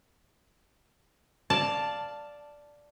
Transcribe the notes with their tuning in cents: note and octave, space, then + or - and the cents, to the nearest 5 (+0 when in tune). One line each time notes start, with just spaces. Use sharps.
D5 +0 F5 +0 A5 +0